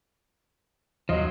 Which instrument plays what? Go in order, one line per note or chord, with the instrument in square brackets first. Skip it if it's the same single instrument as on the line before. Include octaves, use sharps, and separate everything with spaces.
[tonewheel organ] D#2 C6 [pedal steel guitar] F3 F#3 [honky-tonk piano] D#5